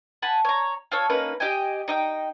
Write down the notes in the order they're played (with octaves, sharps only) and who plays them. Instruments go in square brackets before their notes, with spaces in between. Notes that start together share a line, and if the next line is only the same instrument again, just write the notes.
[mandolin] F#5 G#5 A5 B5
C#5 A#5
F4 A4 C#5
A#3 C#4 D#4 B4
G4 D#5 G5 G#5
D#4 D#5 G5